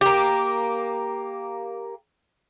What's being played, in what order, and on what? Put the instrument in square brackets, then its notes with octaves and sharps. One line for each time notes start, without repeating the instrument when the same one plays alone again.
[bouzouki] A#3 G4